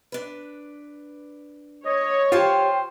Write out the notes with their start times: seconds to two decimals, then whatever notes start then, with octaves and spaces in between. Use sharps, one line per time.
0.12 D4 B4
1.86 C#5 D#5
2.32 F4 G4 C5 G5 A5